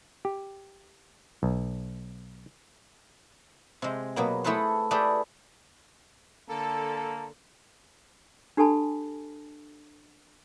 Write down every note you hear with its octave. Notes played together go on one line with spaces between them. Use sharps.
G4
B1
C3 G#3
B2 F#3 A#3
A3 E4 G#4 A4 B4 C5
A3 G4 G#4 B4 D5 E5
D3 A#3 A4 A5
D4 G4 A4 G#5 A5 B5